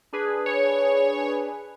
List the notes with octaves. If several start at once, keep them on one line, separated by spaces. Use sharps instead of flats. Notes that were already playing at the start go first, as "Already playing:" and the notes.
D4 G#4 B4
C#5